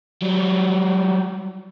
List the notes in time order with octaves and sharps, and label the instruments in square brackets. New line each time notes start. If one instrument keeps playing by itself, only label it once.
[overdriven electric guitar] F#3 G3